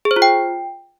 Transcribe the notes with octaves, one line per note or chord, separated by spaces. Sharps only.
G#4
C5
F4
G5